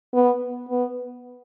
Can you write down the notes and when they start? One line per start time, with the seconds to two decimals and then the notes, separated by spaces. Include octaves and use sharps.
0.14 B3
0.69 B3